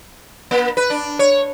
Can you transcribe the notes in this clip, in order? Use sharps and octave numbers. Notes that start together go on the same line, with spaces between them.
A#3
B4
D4
C#5